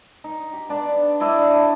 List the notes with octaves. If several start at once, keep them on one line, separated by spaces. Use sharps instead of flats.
D#4
G4
B3 D4 D5
D4 E4 D5 D#5
D4 D#5